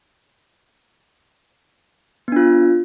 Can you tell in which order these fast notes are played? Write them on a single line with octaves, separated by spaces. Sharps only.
B3 D4 F4